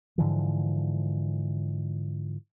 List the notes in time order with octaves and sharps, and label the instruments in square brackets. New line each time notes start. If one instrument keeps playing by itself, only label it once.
[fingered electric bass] G#2 D3 E3 F3